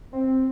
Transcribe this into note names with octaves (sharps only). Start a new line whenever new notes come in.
C4